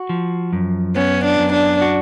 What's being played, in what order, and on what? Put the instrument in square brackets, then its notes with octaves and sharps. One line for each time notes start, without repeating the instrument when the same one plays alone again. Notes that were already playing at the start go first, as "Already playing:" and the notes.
Already playing: [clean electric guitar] F#4
F3
F#2
[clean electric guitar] B3 [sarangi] C#4
[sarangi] D4
[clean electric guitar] F#2
[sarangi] D4
[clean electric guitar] F#4